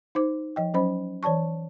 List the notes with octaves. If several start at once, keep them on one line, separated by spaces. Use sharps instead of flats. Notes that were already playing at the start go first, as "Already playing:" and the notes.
D#4 C5 D6
F3 D#5 G5
F#3 C#4 C5 D#5 B5
E3 C#5 D5 A5 C#6